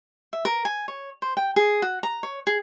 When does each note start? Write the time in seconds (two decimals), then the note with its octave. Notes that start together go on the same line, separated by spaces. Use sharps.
0.33 E5
0.45 A#4
0.65 G#5
0.88 C#5
1.22 C5
1.37 G5
1.56 G#4
1.82 F#4
2.03 A#5
2.23 C#5
2.47 G#4